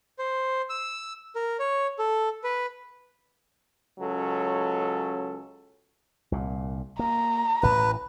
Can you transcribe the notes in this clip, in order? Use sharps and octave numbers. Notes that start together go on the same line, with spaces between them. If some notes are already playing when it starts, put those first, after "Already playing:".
C5
E6
A#4
C#5
A4
B4
C#2 F#3 C#4 A4
C2 A#2
A#3 A#5
A1 A2 B4